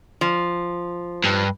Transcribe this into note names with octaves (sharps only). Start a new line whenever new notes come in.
F3
G2